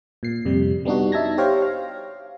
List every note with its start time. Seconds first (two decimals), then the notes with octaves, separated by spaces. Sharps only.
0.23 A#2 C7
0.45 F2 C3 G3
0.85 G3 B3 D4 D#4 F#4
1.12 D#4 E5 A5 G#6 A#6
1.38 G4 C5 C#5 F5 G5
1.62 F5